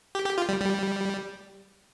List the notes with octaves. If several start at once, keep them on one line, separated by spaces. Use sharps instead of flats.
G4
G4
F4
G3
G3